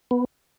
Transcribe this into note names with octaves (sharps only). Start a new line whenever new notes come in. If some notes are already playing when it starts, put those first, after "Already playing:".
B3